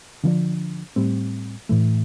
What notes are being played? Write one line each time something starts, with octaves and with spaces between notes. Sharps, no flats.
D3 F3 A#3 D4
A2 G3 C4
A2 E3 A3